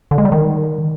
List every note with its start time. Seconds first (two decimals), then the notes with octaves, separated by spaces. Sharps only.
0.11 D3
0.18 G#3
0.25 G3
0.32 D#3